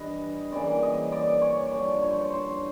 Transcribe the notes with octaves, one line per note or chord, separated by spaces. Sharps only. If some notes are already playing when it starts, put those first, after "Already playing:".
Already playing: G2 E3 G3 B4 D#5
C#3 E3 G3 A#3 D5
D#5
D5
C#5
G2 D3 F3 D5
C#5
C5
C#5
C5